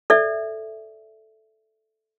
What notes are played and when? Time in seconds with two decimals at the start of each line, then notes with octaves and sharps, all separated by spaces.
0.10 A4 D5 E5